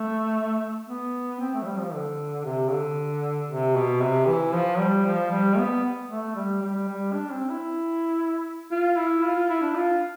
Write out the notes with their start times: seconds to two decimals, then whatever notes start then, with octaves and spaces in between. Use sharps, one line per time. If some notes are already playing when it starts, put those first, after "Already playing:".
Already playing: A3
0.89 B3
1.40 C4
1.54 A3
1.62 F3
1.67 G3
1.80 F3
1.93 D3
2.45 C3
2.71 D3
3.50 C3
3.76 B2
4.01 C3
4.27 E3
4.53 F3
4.79 G3
5.06 F3
5.31 G3
5.58 B3
6.10 A3
6.36 G3
6.62 G3
6.88 G3
7.14 D4
7.31 C4
7.50 E4
8.71 F4
8.97 E4
9.24 F4
9.36 F4
9.49 E4
9.62 D4
9.76 F4